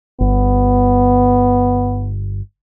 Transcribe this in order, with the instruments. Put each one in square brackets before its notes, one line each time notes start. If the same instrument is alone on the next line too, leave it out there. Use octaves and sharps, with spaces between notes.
[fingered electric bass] G1 [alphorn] B3